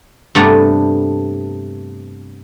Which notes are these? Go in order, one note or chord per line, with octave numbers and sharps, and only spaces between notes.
G2 C3 A3 B3 D5 A#5